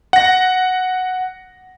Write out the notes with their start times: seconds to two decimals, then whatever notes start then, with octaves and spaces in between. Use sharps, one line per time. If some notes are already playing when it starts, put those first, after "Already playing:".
0.13 F#5 A#6